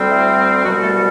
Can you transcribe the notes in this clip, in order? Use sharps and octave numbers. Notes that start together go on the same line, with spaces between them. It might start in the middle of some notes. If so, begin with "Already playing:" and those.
Already playing: D2 D3 G3 C4
E4
C2 B2 F#3 G3 F#4
A3 A4